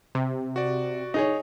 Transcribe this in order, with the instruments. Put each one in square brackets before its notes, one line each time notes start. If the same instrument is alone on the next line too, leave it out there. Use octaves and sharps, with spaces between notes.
[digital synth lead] C3
[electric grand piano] F#4 D5
[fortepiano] D#4 G#4 C#5